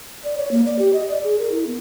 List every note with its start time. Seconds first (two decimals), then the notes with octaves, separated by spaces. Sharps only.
0.24 D5
0.37 C#5
0.51 A#3
0.66 D5
0.79 G4
0.93 D#5
1.08 D5
1.24 G#4
1.39 A#4
1.52 E4
1.67 B3